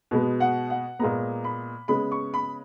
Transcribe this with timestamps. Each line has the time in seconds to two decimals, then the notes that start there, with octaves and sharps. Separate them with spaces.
0.11 B2 G#3 B3
0.40 F#5
0.70 F#5
0.99 A#2 G#3 B3 A#5
1.44 B5
1.88 C#3 G#3 B3 B5
2.12 C#6
2.34 B5